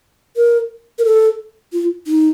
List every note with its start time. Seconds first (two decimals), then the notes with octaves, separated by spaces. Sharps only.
0.36 A#4
0.98 A#4
1.05 A4
1.73 F4
2.07 D#4